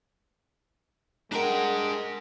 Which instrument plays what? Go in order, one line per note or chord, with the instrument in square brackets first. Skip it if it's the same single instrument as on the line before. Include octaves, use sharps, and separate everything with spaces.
[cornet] G#3 [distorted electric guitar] D4 G5 [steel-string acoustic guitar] A#4 F#5 A#5